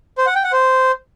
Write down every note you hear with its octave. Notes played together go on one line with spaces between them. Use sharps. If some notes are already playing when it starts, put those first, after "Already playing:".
C5
F#5
G5
F#5
C5